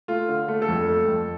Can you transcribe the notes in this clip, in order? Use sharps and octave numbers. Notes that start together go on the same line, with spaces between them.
A3 F4
D3
A3
A4
F2
A3
F2